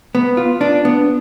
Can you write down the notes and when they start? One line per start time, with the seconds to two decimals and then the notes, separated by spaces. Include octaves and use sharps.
0.15 B3
0.37 F4
0.61 D4
0.85 B3